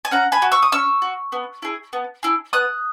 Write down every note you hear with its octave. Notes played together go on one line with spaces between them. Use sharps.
G#5
C#4 F#5 A#5
G#5 B5
F#4
C#6 E6
D#6
C#4 C#6 E6
F#4
B3
E4 G#4
B3
E4 G#4
B3 D#6 F#6